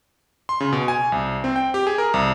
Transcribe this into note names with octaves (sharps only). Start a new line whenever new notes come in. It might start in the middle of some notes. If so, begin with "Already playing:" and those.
C6
C#3
B2
G#5
C2
C4
G5
G4
G#4
A#4
C2